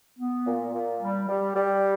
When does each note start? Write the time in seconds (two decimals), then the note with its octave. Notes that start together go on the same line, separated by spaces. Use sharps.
0.18 B3
0.45 A#2
0.73 A#2
1.00 G3
1.28 G3
1.55 G3